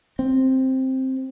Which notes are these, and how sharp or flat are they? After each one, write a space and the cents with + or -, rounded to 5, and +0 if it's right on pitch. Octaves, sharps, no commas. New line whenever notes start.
C4 +5